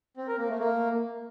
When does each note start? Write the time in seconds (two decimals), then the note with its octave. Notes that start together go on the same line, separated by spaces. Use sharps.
0.17 C4
0.27 A#4
0.38 A#3
0.49 A3
0.59 A#3